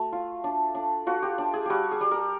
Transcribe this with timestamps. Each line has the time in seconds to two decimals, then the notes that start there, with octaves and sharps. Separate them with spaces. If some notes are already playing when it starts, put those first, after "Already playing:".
Already playing: A3 F#4
0.12 F4
0.44 D4
0.75 D4
1.07 F4 F#4
1.22 G4
1.38 D4
1.54 G#4
1.66 G3 F#4 G4
1.91 G#4
2.01 G3
2.11 A#4